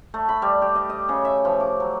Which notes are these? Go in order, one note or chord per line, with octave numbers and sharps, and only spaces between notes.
A3
B5
G3
G4
D#5
D#5
C#3
E5
F3
D6
F#3